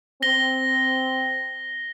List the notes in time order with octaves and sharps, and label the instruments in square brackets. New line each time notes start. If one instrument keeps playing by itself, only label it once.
[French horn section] C4 [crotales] A#6 G7